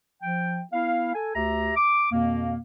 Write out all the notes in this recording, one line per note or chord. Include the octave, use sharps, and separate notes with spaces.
F3 G5
B3 E4 F5
A4 G#5
D2 G4 E5 A#5
D6
F2 B2 A#3